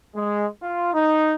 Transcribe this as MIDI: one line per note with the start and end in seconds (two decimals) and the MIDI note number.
0.15 0.46 56
0.62 0.90 65
0.93 1.34 63